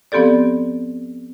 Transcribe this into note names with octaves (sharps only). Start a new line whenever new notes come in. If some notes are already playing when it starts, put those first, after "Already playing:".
F3 B3 C4 G4 A4 D5